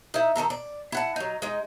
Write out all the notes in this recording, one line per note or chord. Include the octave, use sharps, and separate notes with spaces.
D#4 E4
D#3 F3 A4 A#5
D5
E4 F#5 A5
F#3 D#4
G#3 D#4